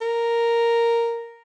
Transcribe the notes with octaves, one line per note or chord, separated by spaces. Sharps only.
A#4